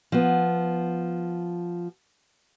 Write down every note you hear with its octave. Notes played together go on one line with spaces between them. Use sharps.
F3 B3